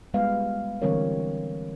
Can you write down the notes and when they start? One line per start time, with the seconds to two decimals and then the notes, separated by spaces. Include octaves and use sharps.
0.14 G3 G#3 B3 B4 F5
0.82 D3 E3 G3 C4 A#4 C#5